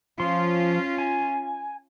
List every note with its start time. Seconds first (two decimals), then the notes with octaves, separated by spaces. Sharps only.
0.20 F3 C#4 F4 C6
0.98 G#5